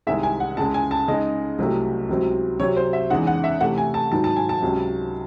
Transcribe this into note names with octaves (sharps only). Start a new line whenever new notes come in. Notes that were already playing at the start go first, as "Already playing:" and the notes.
C2 C3 D#3 G#3 E5
G#5
F#5
C#2 C#3 G#3 A5
G#5
A5
C#3 G#3 D#4 D#5
C2 C3 F#3 A3
C#2 C3 F#3 C4
C3 F#3 C4 C#5
C5
E5
E2 C#3 G#3 D#4 F#5
F#5
E5
C3 E3 A3 F#5
G#5
A5
G#2 D#3 F#3 A5
A5
G#5
A5
C#2 C3 F#3 C#4